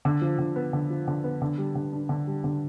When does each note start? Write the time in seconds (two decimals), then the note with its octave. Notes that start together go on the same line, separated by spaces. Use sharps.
0.05 D3
0.21 F3
0.39 D3
0.56 B3
0.73 D3
0.90 F3
1.08 D3
1.24 B3
1.42 D3
1.58 G3
1.75 D3
1.93 D4
2.09 D3
2.27 G3
2.44 D3